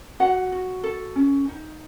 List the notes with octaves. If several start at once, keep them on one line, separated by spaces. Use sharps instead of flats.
F#4 F#5
F#4
A4
C#4
D#4